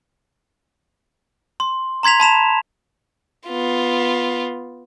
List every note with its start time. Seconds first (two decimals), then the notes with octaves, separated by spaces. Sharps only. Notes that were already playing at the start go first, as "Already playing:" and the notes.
1.60 C6
2.03 A#5 C6 G#6 B6 F7
2.20 A5 B5 E7 F7
3.48 B3 F4